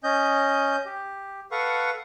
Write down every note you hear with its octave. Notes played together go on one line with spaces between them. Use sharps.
C#4 D#5 G6
G4
A4 B4 F5 F#5 C#6